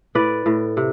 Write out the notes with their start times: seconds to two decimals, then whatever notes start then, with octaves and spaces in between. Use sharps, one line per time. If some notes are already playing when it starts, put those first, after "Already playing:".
0.15 A2 B4 D5
0.46 A2
0.77 C3